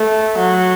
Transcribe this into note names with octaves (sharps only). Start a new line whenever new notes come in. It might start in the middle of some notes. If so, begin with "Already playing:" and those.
Already playing: A3
F#3